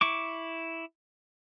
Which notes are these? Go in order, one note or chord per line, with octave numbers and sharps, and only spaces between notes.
E4 C#6 D6